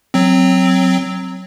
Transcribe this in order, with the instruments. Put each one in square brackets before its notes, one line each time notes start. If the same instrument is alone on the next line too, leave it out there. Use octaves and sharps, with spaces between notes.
[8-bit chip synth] F#3 C4